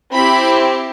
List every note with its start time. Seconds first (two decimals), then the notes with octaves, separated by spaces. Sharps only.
0.14 C4 E4 G4 B5